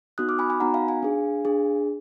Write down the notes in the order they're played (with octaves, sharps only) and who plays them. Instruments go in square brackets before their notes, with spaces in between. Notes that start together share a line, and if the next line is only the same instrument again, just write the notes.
[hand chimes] B3 D#4 F#4 D#6 F#6
D6 F6
G#5 B5
G#5 B5
B3 D#4 F#4 F#5 A#5
F5 G#5
F5 G#5
D4 G#4
D4 G#4